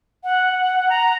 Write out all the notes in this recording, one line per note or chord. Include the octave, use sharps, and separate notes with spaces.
F#5
A#5